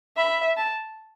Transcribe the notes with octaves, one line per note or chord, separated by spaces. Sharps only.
E5 B5
A5